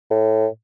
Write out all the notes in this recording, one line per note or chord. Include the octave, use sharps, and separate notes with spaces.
A2